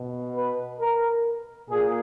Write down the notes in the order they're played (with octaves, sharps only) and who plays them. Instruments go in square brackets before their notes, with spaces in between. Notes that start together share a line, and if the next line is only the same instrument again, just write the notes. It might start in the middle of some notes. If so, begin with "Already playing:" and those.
Already playing: [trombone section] B2
B4
A#4
A#2 G#4